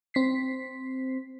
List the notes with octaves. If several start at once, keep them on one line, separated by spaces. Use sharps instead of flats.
C4 B6 C7